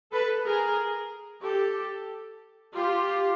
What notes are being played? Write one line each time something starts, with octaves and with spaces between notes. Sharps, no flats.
A4 B4
G#4 A#4
G4 A4
F4 G4